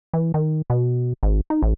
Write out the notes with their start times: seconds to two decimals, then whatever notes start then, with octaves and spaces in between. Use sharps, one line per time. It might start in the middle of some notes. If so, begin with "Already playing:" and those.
0.13 E3
0.34 D#3
0.70 B2
1.23 G#1
1.50 D#4
1.62 A1